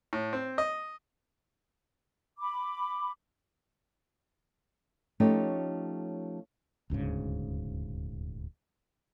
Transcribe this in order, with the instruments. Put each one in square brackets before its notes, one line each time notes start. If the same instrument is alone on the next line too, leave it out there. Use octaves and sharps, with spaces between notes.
[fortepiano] A2
C4
D#5
[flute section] B5 D6
[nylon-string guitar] F3 A3 C#4 D#4 G4 C#5
[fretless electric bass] D#1 D2 G#2 C#3